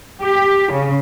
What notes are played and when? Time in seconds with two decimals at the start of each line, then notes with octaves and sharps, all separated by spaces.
0.22 G4
0.72 C#3